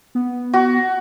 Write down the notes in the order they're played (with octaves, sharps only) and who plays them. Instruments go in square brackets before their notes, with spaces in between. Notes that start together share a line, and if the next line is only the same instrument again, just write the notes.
[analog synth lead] B3
[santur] F#4